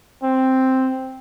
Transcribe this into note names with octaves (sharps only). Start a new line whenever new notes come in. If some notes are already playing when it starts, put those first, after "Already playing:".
C4